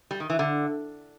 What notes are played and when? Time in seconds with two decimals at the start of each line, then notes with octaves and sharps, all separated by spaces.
0.11 G3
0.20 D#3
0.30 E3
0.39 D3